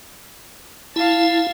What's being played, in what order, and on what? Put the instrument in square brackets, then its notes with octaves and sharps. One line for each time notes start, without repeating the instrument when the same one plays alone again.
[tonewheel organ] E4 [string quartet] F5 A5